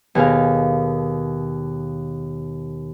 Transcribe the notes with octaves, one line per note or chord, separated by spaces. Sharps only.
D#2 B2 G#4 A#4 F5